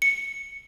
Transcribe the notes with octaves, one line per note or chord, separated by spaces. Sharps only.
C#7